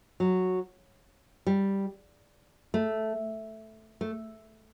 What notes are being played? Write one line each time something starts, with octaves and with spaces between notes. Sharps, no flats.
F#3
G3
A3
A3